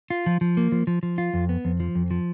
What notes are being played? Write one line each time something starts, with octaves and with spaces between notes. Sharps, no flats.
F4
F3
F3
A#3
F3
F3
F3
F4
F2
B3
F2
F3
F2
F3